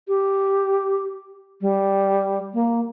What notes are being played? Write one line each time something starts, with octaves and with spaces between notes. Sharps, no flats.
G4
G3
A#3